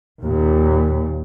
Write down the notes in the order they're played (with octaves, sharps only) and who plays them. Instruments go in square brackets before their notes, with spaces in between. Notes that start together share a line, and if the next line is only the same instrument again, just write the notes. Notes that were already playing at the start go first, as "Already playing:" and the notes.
[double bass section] D#2 A#2